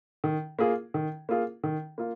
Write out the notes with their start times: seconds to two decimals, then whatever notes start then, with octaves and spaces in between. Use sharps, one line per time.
0.24 D#3
0.59 A#3 F4 G#4
0.94 D#3
1.29 A#3 F4 G#4
1.64 D#3
1.98 A#3 F4